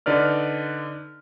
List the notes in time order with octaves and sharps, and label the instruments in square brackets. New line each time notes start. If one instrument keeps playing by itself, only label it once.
[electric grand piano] D3 D#4 B4 D5 F6